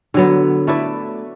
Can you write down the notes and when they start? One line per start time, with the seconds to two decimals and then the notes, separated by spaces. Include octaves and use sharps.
0.14 D3 F#3 B3
0.67 A3 E4 B4 D5